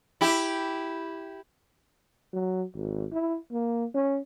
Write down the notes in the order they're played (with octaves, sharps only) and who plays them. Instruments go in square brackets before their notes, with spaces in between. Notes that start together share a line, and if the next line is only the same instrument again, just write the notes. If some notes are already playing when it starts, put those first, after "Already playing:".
[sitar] E4 G4
[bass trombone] F#3
G#1
E4
A#3
C#4